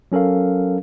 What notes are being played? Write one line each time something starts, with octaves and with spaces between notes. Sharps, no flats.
F#3 C#4 A4 A#4 F5